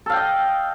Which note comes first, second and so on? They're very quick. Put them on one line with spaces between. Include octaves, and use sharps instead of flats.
A4 F5 G5 D#5